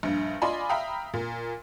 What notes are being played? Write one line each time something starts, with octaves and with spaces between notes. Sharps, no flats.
A#1 G2
F4 D5 D#5 G#5 B5 C6
E5 F5 G5 A#5 B5 D#6
A#2